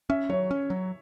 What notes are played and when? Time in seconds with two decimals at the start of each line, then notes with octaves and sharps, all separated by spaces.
0.09 C#4 E5
0.29 F#3 C#5
0.51 C#4
0.70 F#3